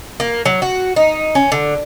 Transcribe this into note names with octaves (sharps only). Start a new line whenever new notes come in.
A#3
F#3
F#4
D#4
C#4
D3